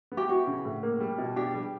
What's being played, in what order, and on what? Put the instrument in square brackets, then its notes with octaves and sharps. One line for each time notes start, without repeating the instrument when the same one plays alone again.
[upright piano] B3
[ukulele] G4
[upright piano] E4 [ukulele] F#4
[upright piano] C#3
A2
A#3
G3
B2
[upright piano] D4 [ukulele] G4
[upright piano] G3